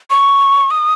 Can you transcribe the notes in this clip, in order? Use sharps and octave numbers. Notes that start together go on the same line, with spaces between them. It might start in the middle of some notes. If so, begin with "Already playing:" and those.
C#6
D#6